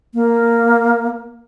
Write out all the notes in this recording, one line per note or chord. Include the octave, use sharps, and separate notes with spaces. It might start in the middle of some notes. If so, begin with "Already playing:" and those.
A#3